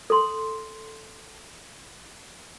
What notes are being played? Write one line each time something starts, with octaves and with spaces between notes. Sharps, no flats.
A4 C6